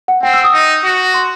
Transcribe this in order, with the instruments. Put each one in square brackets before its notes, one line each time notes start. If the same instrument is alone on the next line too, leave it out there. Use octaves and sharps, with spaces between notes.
[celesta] F#5
[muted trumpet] C4 [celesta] G5
[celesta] E6
D#6
[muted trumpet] D#4
F#4
[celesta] C6